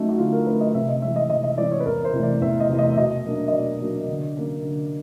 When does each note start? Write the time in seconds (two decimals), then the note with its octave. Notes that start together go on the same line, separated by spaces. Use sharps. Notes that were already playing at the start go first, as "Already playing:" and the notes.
Already playing: F#3 A3 C#4 D#4
0.09 F#4
0.18 D3 F4
0.32 A#4
0.47 F#3 A3 C#4 B4
0.60 D#5
0.74 C3 E5
0.88 D#5
1.02 E3 G#3 C4 E5
1.16 D#5
1.29 C3 D#5
1.44 D#5
1.58 E3 G#3 C4 D5
1.71 C#5
1.80 B4
1.86 E2 A#4
2.05 C5
2.13 C3 E3 A3
2.23 D5
2.41 E2 E5
2.60 D#5
2.69 C3 E3 A3
2.79 D#5
2.92 E5
2.97 B2 D#5
3.25 F#3 A#3 D4
3.48 D#5
3.52 B2 D5
3.81 F#3 A#3 D4
4.08 D3
4.37 F#3 A#3 C#4
4.64 D3